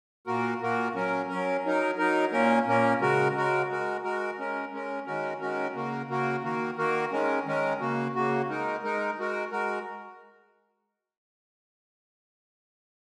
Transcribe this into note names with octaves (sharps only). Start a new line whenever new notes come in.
A#2 A#3 F#4 A#4
A#2 A#3 F#4 A#4
F#3 C#4 A#4
F#3 C#4 A#4
F#3 D#4 A#4
F#3 D#4 A#4
A#2 A#3 C#4 A#4
A#2 A#3 C#4 A#4
C#3 G#3 F#4 A#4
C#3 G#3 F#4 A#4
G#3 F#4 A#4
G#3 F#4 A#4
G#3 C#4 A#4
G#3 C#4 A#4
D#3 G#3 C#4 F#4 A#4
D#3 G#3 C#4 F#4 A#4
C#3 A#3 F#4 A#4
C#3 A#3 F#4 A#4
D#3 A#3 F#4 A#4
D#3 A#3 F#4 A#4
D#3 G#3 C#4 A#4
D#3 G#3 C#4 A#4
C#3 A#3 F#4
C#3 A#3 F#4
G#3 D#4 A#4
G#3 D#4 A#4
G#3 F#4 A#4
G#3 F#4 A#4